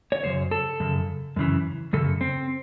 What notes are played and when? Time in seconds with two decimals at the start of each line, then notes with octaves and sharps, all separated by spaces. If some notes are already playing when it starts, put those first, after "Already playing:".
0.12 C#5
0.24 F#2 C#3 C5
0.51 A4
0.80 F#2 C#3
1.36 F#2 C#3 E3
1.93 F#2 C#3 A4
2.21 C4